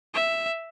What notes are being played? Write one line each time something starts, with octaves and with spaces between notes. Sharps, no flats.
E5